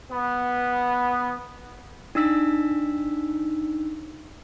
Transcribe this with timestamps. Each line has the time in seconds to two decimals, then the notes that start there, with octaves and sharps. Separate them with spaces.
0.11 B3
2.15 D4 D#4 E6 B6